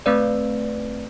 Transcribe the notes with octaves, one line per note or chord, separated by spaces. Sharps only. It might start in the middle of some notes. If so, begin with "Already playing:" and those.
A3 C4 B4 D5